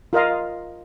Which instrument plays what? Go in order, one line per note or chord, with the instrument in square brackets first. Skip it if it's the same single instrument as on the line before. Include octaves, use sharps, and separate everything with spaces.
[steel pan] F4 A#4 D#5 F5